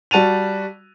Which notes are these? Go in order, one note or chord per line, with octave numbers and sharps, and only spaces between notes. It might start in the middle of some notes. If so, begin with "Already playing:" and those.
G3 F#4 A5 D#7 F7